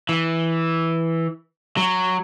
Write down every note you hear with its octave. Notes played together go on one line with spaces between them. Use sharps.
E3
F#3